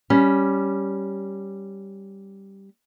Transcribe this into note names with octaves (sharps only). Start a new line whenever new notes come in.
G3 C#4